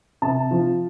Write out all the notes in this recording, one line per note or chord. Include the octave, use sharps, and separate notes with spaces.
C3 A5
F3